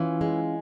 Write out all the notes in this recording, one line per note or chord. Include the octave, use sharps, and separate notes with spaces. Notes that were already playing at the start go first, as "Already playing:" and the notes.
Already playing: E3 C#4 F4
G#3